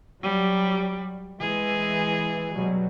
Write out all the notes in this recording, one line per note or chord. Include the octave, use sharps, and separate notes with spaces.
F#3 G3
E3 G#3 G#4
B2 F#3 G3